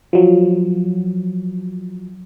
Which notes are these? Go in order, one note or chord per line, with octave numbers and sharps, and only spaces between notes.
F3 F#3